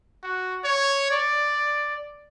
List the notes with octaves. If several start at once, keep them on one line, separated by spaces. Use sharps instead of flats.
F#4
C#5
D5